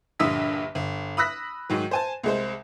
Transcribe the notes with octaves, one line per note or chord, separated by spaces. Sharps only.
A#1 G2 D3 D#6 E6 B6
G1
B5 D#6 E6 F#6 A#6 B6
G#2 D#3 F#3
C5 G#5 A5
C2 G#3 C5